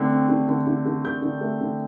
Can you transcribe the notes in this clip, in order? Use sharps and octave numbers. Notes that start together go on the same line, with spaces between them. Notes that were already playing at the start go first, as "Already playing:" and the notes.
Already playing: D3 A3 C4
C4
D3
D3
D3
D3
D3 G6
D3
A3
D3